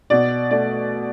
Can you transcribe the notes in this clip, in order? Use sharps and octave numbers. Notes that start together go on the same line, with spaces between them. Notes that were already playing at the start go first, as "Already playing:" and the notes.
B2 D5
A3 D5